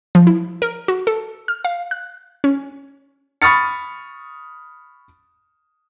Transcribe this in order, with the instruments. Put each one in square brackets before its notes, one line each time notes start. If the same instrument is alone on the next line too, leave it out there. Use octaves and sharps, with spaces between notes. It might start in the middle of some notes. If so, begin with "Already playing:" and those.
[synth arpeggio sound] F3
E4
A#4
F#4
A4
F6
F5
F#6
C#4
[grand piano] B5 C#6 D#6 F6 A6 C#7